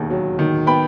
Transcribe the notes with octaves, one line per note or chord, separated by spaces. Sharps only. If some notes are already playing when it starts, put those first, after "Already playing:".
Already playing: E1 D#2 D#3
F#3
D#3
B3 G5 B5